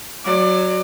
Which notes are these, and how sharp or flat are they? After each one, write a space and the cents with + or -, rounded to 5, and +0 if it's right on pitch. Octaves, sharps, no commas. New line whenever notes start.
F#3 +0 D5 +25